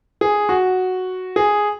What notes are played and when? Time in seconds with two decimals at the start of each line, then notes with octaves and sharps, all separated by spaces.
0.21 G#4
0.49 F#4
1.36 G#4